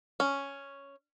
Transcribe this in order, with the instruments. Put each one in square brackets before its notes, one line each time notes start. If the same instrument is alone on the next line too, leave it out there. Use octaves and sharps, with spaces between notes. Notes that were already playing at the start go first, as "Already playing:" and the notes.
[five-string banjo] C#4